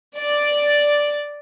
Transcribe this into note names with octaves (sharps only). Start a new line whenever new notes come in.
D5